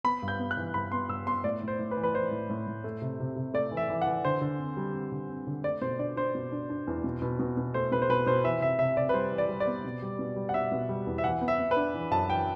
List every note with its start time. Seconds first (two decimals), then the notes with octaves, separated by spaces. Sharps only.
0.04 B3 B5
0.22 G2
0.28 G6
0.39 B3
0.51 F#6
0.57 E3
0.74 G2 B5
0.92 B3 C6
1.09 G2 E6
1.26 B3 C6
1.44 A2 D5
1.62 A2
1.68 C5
1.79 A2
1.91 B4
1.97 E3
2.03 B4
2.14 E3 C5
2.31 A2
2.50 A2
2.67 A2
2.84 A3
3.02 C3
3.20 C3
3.36 C3
3.54 A3 D5
3.71 E3
3.77 E5
3.90 E3
4.02 E3 F#5
4.25 D3 C5
4.41 D3
4.59 C4
4.77 G3
4.94 C4
5.12 D3
5.29 C4
5.47 D3
5.64 A3 D5
5.82 B2 C5
5.99 D4 D5
6.16 D4 C5
6.35 B2
6.52 D4
6.70 D4
6.87 E2
7.04 B2
7.22 B2
7.39 B2
7.57 B2
7.74 A3 C5
7.92 B2 B4
8.02 C5
8.09 B2 B4
8.27 B2 C5
8.44 E3 E5
8.61 C3 E5
8.79 C3 E5
8.97 C3 D5
9.09 B4
9.14 G3 C5
9.32 E3
9.38 D5
9.49 G3
9.60 D5
9.67 B3
9.84 B2
10.02 G3
10.19 B2
10.36 G3
10.49 F#5
10.54 B2 E5
10.72 B2
10.89 G3
11.07 E2
11.18 E5
11.24 E3 F#5
11.41 B3
11.48 E5
11.59 B3
11.71 B4
11.76 D4
11.94 E3
12.11 F#2 A5
12.30 E3 G5